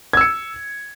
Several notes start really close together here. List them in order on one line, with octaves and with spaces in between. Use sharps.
G#6 E6 C#7